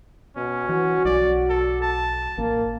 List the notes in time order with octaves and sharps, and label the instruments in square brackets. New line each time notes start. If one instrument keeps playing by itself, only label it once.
[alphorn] B2 [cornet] C#4
[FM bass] E3 [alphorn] F#4
[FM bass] B1 [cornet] D5
[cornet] A4
A5
[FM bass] A1 [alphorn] A#3